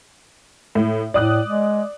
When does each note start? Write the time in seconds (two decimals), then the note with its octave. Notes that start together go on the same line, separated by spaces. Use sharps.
0.75 A2
1.14 A2 D5 D#6 F#6
1.46 G#3